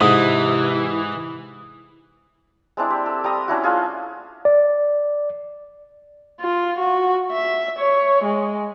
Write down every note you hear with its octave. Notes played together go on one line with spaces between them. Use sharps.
G#2 C3 E3 D#6
G#3 C4 D4 E4
G4
A4
G3 A#5 D#6
C#4 D4 E4 F#4
A3 F4 G#4
D5
F4
F#4
E5
C#5
G#3